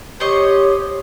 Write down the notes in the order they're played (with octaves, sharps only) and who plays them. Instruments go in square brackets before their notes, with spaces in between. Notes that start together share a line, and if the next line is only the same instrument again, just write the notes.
[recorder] G4 [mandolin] C5 D#5 C#6 [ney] C#5